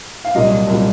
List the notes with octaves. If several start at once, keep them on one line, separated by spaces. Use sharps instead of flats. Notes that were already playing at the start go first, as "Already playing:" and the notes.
F5
C2 A#2 F#3 D#5
C2 A#2 F#3